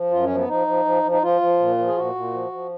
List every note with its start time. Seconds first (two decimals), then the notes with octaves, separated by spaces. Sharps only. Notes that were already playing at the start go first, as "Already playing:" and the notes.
Already playing: F3
0.11 F#2 F4
0.23 C#4
0.30 F3
0.36 B3
0.48 F3 D#4
0.67 F3
0.85 F3
1.03 F3
1.11 D#4
1.22 F3 F4
1.41 F3
1.59 A#2
1.78 F3
1.87 G#4
1.96 A#2 F#4
2.15 A#2
2.33 F3
2.52 F3